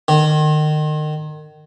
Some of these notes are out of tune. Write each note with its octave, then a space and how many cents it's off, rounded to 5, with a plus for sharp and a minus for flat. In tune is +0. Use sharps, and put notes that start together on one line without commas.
D#3 -30